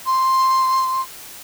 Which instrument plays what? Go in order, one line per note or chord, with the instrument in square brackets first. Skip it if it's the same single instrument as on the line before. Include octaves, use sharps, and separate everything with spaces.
[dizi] C6